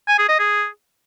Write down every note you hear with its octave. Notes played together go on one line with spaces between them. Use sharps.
G#5
G#4
D#5
G#4